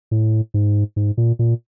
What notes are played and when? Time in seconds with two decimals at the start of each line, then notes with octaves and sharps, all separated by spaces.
0.11 A2
0.54 G#2
0.96 G#2
1.17 A#2
1.39 A#2